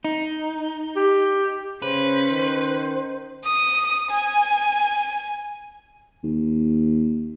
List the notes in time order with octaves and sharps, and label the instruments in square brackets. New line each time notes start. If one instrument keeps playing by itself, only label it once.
[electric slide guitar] D#4
[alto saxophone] G4
[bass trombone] C#3 [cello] C#4 [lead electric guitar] B4 [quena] C5
[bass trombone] D#3
[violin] D#6
G#5
[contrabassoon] D#2